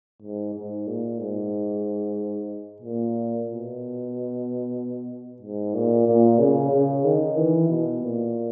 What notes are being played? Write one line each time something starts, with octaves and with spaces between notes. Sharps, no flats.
G#2
G#2
A#2
G#2
A#2
B2
G#2
A#2
A#2
C#3
C#3
D#3
E3
B2
A#2